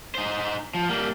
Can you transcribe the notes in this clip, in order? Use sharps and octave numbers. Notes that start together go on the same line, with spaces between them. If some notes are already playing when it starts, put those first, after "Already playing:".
D#4 C5
F3
G3 A#3